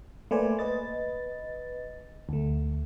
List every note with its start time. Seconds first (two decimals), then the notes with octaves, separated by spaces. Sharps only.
0.31 A3 A#3 B4 C5 D5 G#5
0.59 B4 D#5 A6
2.29 D2 A3